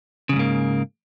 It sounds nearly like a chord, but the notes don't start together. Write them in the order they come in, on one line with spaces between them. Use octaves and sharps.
C#3 F2 G#2 A#3